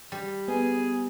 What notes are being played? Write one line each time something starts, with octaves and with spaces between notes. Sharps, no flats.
G3
B3 G#4